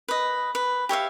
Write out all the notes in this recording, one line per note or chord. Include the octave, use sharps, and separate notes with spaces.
B4 D#5
B4
G4 C#5 E5 F5